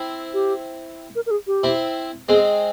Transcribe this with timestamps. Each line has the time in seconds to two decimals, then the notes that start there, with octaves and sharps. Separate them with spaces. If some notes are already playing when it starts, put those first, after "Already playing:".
Already playing: C4 E4
0.33 G4
1.15 A#4
1.26 A#4
1.31 G#4
1.47 G4
1.63 C4 E4
2.29 G#3 C4 G#4